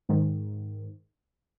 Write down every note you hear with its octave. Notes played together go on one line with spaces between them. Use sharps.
G#2 D#3